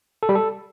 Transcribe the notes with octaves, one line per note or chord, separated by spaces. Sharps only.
A4
G3
A4